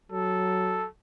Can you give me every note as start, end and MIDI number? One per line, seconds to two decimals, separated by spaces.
0.12 0.87 54
0.12 0.87 69